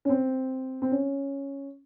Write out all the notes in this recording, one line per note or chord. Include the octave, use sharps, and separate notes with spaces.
C#4
C4
C4
C#4